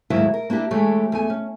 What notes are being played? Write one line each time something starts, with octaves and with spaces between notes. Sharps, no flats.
D2 G#2 D#3 F#3 A#3 E4
A#4
A#3 D4 E4 G4
E3 G#3 A3 G4 A4 C#5
E2 A3 G#5
C#4